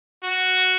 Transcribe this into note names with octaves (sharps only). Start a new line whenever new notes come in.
F#4